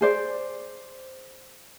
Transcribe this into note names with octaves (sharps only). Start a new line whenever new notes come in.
G#4 C5 D5